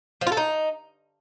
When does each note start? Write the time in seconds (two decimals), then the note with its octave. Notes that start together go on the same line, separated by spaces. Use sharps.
0.21 F3
0.27 F4
0.32 A4
0.37 D#4